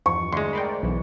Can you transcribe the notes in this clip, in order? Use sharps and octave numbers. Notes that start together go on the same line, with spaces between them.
E2 G2 F3 C#6
D2 G#3 C6
A#4 C5 D5 G5 B5
B1 B2 E3